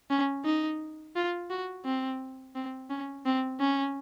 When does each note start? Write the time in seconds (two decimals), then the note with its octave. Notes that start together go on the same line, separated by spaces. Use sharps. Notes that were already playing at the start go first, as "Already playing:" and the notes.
0.10 C#4
0.45 D#4
1.16 F4
1.50 F#4
1.85 C4
2.55 C4
2.90 C#4
3.26 C4
3.60 C#4